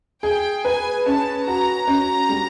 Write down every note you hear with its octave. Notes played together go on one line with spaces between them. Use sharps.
G#4 G5
B4 G#5
C#4 A5
F#4 A#5
C#4
G3